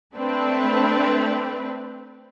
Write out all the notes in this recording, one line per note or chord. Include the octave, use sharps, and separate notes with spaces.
A3 C4 D4 B4